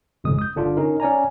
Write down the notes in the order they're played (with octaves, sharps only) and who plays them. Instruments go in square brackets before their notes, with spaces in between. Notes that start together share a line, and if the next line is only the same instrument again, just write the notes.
[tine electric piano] G#1 F2 C#3 G#3 D#6
D#6 G6
G1 D3 D4 F4
C#4 D#4 A#4
C#4 D5 G#5 A#5